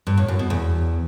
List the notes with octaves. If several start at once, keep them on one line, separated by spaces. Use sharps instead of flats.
G2
A2
F#2
B2
E2